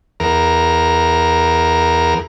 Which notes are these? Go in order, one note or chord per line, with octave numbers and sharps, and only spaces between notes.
E2 A#4